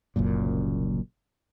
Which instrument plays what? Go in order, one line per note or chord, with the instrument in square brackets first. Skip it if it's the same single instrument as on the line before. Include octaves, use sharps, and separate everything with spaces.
[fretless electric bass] F#1 C2 F#2 A#2